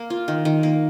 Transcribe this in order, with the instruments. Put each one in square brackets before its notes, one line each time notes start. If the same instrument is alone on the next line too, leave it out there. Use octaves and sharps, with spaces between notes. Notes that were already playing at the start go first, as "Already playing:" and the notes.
Already playing: [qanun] A#3
F4
D#3
D#3
A#3